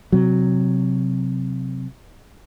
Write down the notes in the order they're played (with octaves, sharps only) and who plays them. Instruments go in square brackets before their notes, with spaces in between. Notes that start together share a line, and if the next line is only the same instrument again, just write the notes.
[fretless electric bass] C3 F#3